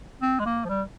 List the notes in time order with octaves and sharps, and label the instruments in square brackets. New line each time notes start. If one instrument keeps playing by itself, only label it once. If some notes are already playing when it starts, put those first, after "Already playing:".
[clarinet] C4
G#3
A#3
F3
G3